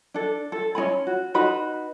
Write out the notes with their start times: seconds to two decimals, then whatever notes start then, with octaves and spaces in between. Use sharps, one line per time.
0.14 D4 A4
0.52 A4
0.75 C#4 D#4 G#5 B5
1.07 F#4
1.34 D#4 F#4 B4 B5